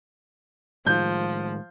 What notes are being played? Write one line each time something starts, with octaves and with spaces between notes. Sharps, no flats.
A2 D#3 F3 G#3 G6